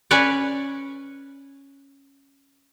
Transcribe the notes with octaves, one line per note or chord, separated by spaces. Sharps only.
C#4 B4 C#5 D5